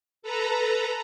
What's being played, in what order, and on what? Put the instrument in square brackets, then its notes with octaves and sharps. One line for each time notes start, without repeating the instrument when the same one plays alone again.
[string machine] A4 B4 A#5